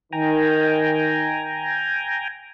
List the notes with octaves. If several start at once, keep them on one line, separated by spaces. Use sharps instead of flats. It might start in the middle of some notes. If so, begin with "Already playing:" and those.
D#3 G5 G#5 A#5